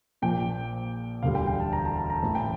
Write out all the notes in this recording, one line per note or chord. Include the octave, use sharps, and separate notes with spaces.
A#1 A#2 F3 G5
E1 D2 D3 G3 F5
G5
G5
A5
A#5
A5
A5
A#5
A1 A2 E3 A5
G5